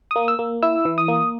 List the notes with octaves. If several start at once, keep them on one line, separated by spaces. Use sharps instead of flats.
A#3 D#6
E6
A#3
E4 E6
E3
D#6
A#3